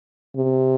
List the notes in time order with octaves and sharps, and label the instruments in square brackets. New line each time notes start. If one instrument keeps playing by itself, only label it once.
[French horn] C3